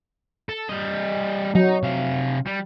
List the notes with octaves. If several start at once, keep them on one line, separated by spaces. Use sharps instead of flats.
A4
G3 D#5
F#3 D#4
C3 F5
G3